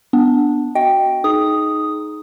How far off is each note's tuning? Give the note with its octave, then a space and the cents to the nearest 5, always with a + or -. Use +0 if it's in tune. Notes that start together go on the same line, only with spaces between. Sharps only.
B3 +0 D4 +0
F#4 +10 D#5 +20 G5 +0
D#4 +0 G#4 +30 D#6 +0